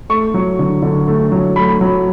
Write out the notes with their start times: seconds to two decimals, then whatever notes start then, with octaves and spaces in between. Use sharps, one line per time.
0.10 A3 C#6
0.34 F#3
0.59 D3
0.82 D3
1.08 A3
1.32 F#3
1.56 A3 B5
1.81 F#3